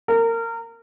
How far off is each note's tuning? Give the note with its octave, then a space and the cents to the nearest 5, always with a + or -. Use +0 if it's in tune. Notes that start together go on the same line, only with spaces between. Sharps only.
A#4 -25